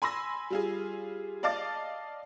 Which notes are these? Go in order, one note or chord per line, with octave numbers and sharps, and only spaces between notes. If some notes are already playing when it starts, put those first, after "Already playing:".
G#5 B5 C6 E6 A#6
G3 F4 G#4
D5 D#5 F5 A5 D6 A6